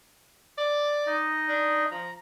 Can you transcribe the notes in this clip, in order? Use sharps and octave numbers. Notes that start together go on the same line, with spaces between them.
D5
D#4 D#5
D4
F3 A#5